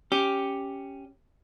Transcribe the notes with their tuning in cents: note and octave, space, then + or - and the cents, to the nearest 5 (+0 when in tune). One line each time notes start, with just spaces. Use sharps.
C#4 +0 G4 +0